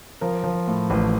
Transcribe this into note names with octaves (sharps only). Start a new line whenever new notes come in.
F3 A#4
F3
A2
A1